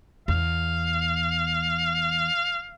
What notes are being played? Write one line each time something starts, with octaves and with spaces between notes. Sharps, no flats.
E2 F5